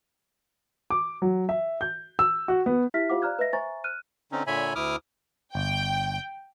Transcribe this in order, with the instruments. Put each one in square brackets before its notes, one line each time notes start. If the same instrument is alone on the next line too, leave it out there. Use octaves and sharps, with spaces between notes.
[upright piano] D6
F#3
E5
G6
E6
F#4
B3
[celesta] E4 G4 E5 F6 B6
F4 G4 C5 F5 F#5 D6
D5 F5 A#5 F6 F#6 G#6
B4 D#5 E5 A#6
C5 E5 G#5 A#5 C#6 A6
F6 F#6 D#7
[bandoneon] D3 C4 C#4 D#4
A#2 D3 C#5 E5 G#5 B5
D2 E4 D6 D#6 F6
[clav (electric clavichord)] G1 [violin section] G5